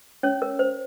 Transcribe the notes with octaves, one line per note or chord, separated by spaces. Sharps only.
C#4 C#5
A#4
C5